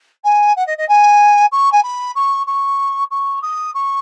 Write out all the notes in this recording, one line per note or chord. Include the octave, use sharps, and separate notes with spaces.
G#5
F#5
D#5
D#5
G#5
C#6
G#5
B5
C#6
C#6
C#6
D#6
C#6